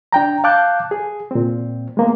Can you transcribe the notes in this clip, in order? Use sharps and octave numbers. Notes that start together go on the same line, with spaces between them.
D4 G5 A#5
F5 A5 D6 F#6 G6
G#4
A#2 C4
G#3 A#3 B3